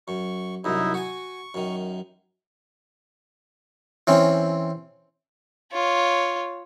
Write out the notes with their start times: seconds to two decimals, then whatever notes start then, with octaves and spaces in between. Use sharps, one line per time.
0.08 F#2 C#6
0.64 C2 F#2 D#4 E4
0.94 F#4 G#5 C#6
1.54 F#2 D#3
4.07 E3 C4 C#4
5.72 F4 C#5